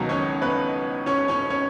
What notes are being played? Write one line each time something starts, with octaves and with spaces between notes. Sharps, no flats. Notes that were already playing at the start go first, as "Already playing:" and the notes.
Already playing: C#2 B2 D#3 F#3 D#4
C#4 C#5
B3 B4
C#4 C#5
C#4 C#5
C#4 C#5